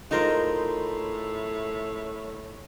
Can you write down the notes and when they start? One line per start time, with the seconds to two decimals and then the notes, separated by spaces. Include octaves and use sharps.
0.11 A2 G#3 D#4 F4 A#4 C5 G5